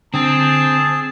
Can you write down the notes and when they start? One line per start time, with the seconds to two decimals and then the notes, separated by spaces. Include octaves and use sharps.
0.14 D3 C4 G#4 A5